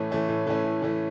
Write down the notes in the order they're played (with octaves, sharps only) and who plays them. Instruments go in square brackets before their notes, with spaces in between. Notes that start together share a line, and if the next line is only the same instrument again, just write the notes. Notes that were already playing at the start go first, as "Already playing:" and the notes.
Already playing: [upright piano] A2 E3 A3 C#4
E3 A3 C#4
A2
E3 A3 C#4
A2
E3 A3 C#4